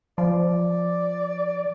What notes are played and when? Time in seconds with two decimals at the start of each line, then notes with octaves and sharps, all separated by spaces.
0.18 F3 D5